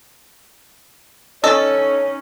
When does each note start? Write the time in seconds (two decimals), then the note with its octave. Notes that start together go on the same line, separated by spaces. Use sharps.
1.44 C#4 D#4 A4 C#5 D#5 A6